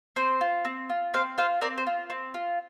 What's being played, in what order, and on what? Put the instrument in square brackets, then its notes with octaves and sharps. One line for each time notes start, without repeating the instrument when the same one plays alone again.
[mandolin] C4 C5
F4
C4
F4
C4 C5 F5
F4 C5 F5
C4 A#4 D5
C5
F4
C4
F4